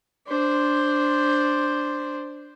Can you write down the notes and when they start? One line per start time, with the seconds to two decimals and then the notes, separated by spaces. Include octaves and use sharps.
0.27 D4 C5